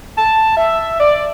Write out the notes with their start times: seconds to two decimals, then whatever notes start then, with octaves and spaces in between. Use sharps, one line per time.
0.18 A5
0.57 E5
1.00 D5